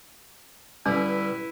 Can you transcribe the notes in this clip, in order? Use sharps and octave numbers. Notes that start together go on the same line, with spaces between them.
G2 D3 G3 C#4 E4 B4